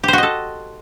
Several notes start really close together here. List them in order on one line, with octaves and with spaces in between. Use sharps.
G4 C5 F#4 D#5 A4